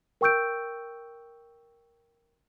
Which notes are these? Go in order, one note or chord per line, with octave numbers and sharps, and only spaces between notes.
A#4 G5 C#6 E6 G6 D7